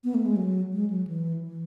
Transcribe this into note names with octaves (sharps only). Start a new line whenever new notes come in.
B3
A3
G#3
F#3
G#3
F#3
E3
E3